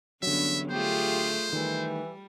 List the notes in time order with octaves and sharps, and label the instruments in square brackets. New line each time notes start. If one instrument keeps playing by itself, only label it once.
[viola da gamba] E2 G2 C#4 [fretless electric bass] D3 F#3 [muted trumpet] E5
[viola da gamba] A3 F4 G#4 [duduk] G4 [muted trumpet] C5
[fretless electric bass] D#3 A3 [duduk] E3 [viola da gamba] G3